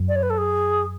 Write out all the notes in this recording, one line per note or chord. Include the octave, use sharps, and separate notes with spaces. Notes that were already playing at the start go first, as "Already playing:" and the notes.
Already playing: F#2
D5
C#5
B4
A4
G#4